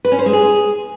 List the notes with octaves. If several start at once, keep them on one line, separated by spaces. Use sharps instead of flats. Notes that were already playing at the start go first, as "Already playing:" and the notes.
B4
C#4
C5
G#3
G#4